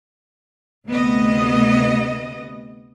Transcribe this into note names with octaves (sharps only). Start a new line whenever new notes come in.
D2 C3 A3 B3 D#5